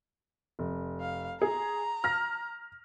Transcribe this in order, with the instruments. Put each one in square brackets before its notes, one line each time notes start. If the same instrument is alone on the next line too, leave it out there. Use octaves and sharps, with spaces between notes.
[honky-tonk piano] F1
[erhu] F5
[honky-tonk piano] G#4 [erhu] A#5
[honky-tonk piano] F6 A#6